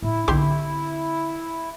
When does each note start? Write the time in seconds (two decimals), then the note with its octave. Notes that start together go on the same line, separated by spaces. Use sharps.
0.02 A2 E4
0.28 B1 D3 C4 G4 C6